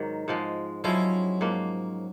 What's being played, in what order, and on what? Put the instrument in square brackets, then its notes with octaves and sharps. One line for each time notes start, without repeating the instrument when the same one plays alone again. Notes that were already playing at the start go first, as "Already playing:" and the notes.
Already playing: [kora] G#2 D#3 F#3
G#2 F3 G#3
[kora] F3 G#3 C#4 E4 [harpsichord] F#3
[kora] G#2 F3 A#3